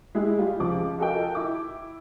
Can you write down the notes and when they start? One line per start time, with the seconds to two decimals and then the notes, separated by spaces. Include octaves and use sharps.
0.15 G#3 E4 G4 G#4
0.38 G3 F4 G4
0.60 C#2 F3 D6
0.99 F4 F#4 A4 A#4 D#5 G5
1.35 E4 D6